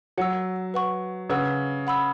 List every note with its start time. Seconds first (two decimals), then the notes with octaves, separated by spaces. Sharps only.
0.18 F#3 F#5 E6
0.74 B4 F#5 C#6
1.30 C#3 B4 F#5 E6
1.87 F#5 B5 E6